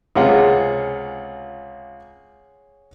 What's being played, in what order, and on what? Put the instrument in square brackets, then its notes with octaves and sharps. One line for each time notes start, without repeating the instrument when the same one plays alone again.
[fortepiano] C#2 C3 F4 [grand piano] G#4 C#5 F#5